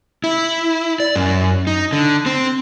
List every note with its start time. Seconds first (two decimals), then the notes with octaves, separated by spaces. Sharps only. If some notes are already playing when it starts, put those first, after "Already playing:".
0.24 E4
1.00 D5
1.16 F#2
1.67 D#4
1.93 D3
2.26 C4